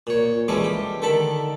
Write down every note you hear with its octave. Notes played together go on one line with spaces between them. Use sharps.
A#2 C#5
E3 G3 G#3 C#4 A4
G4
D3 D#3 A4 A5 B5